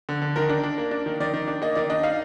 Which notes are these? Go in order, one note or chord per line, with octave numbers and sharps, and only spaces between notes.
D3
D3
D#3 A#4
D4
D4
A#3
D4
D#3
D#3 D5
D#3
D4
A#3 D#5
D#3 D5
D4 D#5
D#4 F5